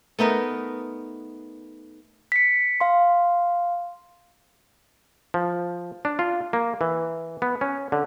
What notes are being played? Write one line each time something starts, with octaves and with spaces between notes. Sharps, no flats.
A3 B3 D#4 A#4
B6 C#7
F5 C6
F3
D4
F4
A#3
E3
B3
C#4
D3